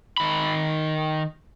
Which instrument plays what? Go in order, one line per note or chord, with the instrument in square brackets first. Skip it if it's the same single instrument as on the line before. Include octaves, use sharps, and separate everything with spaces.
[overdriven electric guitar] D#3 B5